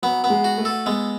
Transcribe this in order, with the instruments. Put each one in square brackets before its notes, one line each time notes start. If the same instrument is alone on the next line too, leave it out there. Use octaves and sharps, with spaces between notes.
[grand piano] F#3 [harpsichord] B3
[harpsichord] B3
[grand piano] G#3
[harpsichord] F#4
[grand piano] A3
[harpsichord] A4
[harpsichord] G#3 [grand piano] B3